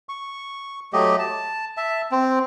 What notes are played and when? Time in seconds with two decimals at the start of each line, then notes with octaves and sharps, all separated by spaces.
0.09 C#6
0.93 F#3 A3 G4 D#5
1.19 A5
1.77 E5 A5
2.11 C4